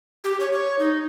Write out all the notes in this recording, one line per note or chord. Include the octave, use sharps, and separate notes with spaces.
G4
C#5
C#5
D#4